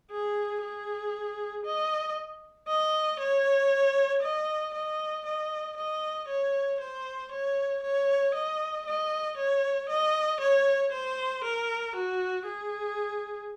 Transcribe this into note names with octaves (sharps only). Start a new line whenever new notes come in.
G#4
G#4
D#5
D#5
C#5
D#5
D#5
D#5
D#5
C#5
C5
C#5
C#5
D#5
D#5
C#5
D#5
C#5
C5
A#4
F#4
G#4